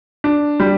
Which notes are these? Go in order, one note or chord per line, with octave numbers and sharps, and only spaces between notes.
D4
G3